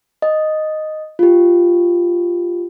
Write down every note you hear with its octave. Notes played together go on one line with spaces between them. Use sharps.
D#5
F4 G4